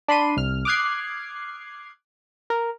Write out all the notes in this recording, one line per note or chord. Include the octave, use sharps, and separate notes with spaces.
D4 B5 C6 D#7
C2 F6
D6 D#6 F6 F#6 G#6 C7
A#4